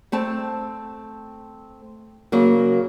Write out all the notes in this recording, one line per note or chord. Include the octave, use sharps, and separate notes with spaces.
A3 C4 A5
C#3 F#3 A#3